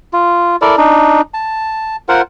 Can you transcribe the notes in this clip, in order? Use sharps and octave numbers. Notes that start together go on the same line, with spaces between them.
F4
E4 A4 A#4 D5
D4 D#4
A5
F4 A#4 C5 F#5